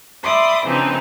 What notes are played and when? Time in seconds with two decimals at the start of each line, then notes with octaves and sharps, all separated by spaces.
0.23 D5 E5 B5 C6 D6 D#6
0.64 C#3 E3 F3 C4 D4 D#4